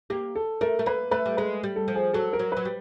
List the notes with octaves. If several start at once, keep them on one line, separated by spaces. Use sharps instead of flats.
A#3 G4
A4
A3 A#4
A3
A#3 B4
A3 B4
G3
G#3 B4
G3
A4
F3
G#4
F#3 A4
A#4
F#3
F#3 B4
G3